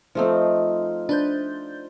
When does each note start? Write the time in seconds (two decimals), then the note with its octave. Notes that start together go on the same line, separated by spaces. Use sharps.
0.15 F3 A3 C4 D#4 F4
1.09 D4 B4 C5 G6